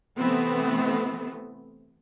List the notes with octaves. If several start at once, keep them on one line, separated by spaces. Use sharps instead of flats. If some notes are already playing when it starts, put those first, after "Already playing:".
C3 E3 A3 B3 C4